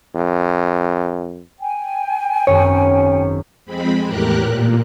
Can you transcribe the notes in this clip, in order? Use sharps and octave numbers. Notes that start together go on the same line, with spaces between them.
F2
G5 G#5
G#1 F#2 C#5
F2 G#3 C4 B5
E2 A2 G4 A#4 F#6
A#2